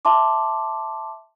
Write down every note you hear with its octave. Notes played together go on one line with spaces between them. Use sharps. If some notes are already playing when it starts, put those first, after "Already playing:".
E5 A5 C6 D6